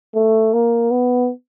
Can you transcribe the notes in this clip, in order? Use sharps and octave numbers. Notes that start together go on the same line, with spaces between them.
A3
A#3
B3